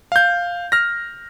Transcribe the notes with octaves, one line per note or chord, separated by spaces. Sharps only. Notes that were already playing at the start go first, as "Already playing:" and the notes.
F5 G6
F6 A#6